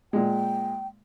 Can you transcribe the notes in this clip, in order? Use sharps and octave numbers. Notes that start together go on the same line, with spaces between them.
A#2 G#3 G5